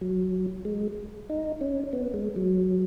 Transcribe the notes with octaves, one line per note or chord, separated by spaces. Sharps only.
F#3
G#3
D#4
C#4
B3
G#3
F#3